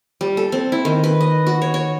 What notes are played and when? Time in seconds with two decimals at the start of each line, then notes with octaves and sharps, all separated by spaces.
0.21 G3
0.37 A4
0.52 C4
0.72 E4
0.85 D#3
1.04 B4
1.21 D#5
1.47 F#4
1.62 C#5
1.74 C#5